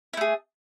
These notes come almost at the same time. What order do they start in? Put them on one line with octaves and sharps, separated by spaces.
E4 A3 G#4